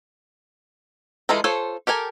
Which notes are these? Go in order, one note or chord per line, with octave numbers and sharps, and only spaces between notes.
E3 G#3 F4 A4 A#5
F4 A4 C5 C#5
G4 A4 A#4 G#5